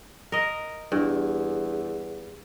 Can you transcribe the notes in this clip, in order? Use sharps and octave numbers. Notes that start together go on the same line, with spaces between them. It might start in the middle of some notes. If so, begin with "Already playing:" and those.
A#4 D#5
E2 G2